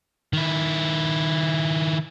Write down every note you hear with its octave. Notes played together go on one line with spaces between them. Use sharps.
D#3 E4